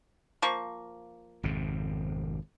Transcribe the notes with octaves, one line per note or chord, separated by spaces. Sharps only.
F3 A#3 C#6
G#1 F2 C3